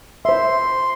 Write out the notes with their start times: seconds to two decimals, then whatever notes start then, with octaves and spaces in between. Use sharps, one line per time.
0.25 C5 E5 C6